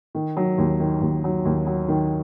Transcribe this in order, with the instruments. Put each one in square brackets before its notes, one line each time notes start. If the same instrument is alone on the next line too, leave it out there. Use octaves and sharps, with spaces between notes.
[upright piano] D#3
F#3
D#2
D#3
D#2
F#3
D#2
F#3
D#3